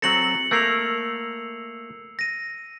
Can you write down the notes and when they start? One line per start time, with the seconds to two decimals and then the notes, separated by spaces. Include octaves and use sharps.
0.02 F#3 C4 A4 A#6 C#7 F#7
0.51 A3 A#3 A#4 E6 C7 F7
2.19 A#6 D#7